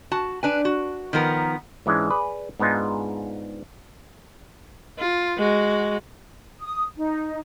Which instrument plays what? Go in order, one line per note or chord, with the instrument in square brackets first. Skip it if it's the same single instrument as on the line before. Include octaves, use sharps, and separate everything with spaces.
[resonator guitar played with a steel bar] F#4 A5
D4 B4 G#5
F#4
D#3 F3 B3 A#4
[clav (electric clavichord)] G#2 E3 G#3 C#4 D4
G#4 B4 D5
G#2 G#3 B3 D4 D#4 F4
[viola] F4
G#3 F#4
[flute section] D#6
D#4